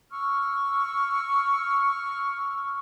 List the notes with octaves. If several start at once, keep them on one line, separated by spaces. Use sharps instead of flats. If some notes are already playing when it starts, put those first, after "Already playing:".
C#6 E6 F6